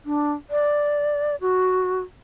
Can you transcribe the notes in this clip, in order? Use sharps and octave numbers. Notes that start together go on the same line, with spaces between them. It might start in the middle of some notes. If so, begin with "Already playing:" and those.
D4
D5
F#4